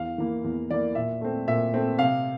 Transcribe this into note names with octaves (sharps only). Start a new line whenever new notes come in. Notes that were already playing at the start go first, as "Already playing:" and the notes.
Already playing: E2 F5
E3 A#3
E2
E3 A#3 D5
A#2 E5
A3 C4
A#2 E5
A3 C4
C3 F5